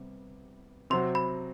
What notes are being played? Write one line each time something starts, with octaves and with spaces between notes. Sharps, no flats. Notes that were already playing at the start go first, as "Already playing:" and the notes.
Already playing: C3 G3 B3
C3 F#3 C4 F#4 C6
B5